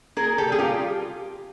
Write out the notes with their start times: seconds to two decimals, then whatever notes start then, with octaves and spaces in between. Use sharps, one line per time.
0.17 A#3 G#4 A#4
0.38 G4 A4
0.49 G3 G#4
0.59 F4 G4